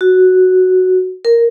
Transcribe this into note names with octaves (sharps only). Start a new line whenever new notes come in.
F#4
A#4